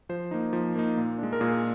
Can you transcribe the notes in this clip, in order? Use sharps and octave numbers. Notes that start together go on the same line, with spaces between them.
F3 C5
A#3 D#4
F3
A#3 D#4
A#2
G#3 D4
A#4
A#2 G#4